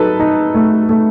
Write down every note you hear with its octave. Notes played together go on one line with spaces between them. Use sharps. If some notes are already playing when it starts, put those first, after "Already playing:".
Already playing: F#3 D#4 A4 B4
D#4
A3
A3